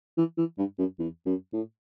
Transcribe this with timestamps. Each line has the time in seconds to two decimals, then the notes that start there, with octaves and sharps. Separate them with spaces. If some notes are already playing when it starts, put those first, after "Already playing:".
0.17 E3
0.38 E3
0.58 G2
0.78 F#2
0.99 E2
1.26 F#2
1.53 A2